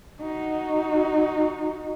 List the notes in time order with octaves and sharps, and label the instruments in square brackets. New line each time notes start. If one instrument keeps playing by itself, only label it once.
[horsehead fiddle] D#4 F#4